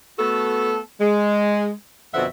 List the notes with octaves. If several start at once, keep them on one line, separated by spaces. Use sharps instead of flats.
A3 B3 F#4 A4
G#3
F2 B2 D3 C4 E5 F#5